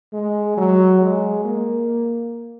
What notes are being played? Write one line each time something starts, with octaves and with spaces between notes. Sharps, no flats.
G#3
F#3
G#3
A#3